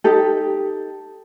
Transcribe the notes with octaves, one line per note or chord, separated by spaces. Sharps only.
D#4 G4 A4